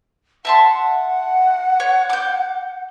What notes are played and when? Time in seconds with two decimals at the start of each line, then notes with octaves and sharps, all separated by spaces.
0.45 E5 F#5 A5 C6
1.80 C#5
2.10 D6 G6